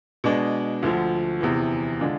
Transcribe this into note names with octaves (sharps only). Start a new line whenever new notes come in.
B2 G#3 D4
D2 D3 F3
E2 C3 E3
D3 G#3 D4 F4